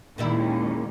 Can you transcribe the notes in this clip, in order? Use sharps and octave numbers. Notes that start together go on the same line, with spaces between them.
D#2 A#2 G3 G#3 C#4 E4